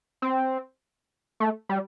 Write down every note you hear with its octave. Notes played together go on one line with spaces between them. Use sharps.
C4
A3
G3